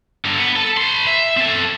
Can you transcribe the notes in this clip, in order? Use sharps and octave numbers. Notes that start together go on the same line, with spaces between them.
G2 D3
B3
A4 A5
B4 C6
E5
C4 A4